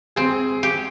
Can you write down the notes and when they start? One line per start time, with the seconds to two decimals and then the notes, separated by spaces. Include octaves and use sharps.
0.16 C4 G#4
0.63 G4